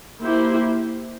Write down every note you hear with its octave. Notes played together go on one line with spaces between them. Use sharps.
A#3 E4 G4 C5